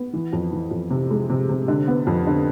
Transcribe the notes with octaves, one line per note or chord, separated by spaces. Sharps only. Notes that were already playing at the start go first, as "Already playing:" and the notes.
Already playing: B3
E3
F2
E3
F2
C3
G#3
C3
C3
D3
B3
F2
D3